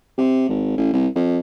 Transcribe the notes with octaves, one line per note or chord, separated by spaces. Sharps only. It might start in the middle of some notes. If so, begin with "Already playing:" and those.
C3
G#1
A1
C2
F2